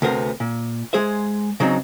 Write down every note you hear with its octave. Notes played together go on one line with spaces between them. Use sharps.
D2 C3 B3 C4 A#4
A#2
G#3 G#4 C5 E5
C#3 F#3 C4 D4 D#4